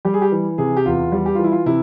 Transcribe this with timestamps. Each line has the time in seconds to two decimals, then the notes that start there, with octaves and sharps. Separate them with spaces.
0.05 G3 G4
0.14 G#4
0.22 G4
0.32 E3
0.58 C3 G#4
0.77 G4
0.86 E2 F4
1.12 G3
1.26 G4
1.35 E3 F4
1.44 E4
1.52 F4
1.66 C3 E4